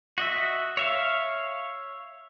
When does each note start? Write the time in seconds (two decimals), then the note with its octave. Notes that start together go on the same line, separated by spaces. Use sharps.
0.18 F#4 D#5 E5
0.77 C#5 E5 F5